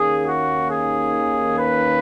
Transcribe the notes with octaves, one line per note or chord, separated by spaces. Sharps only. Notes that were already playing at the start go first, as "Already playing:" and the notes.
Already playing: D#2 D#3 A#3 C#4 G#4
F#4
G#4
B4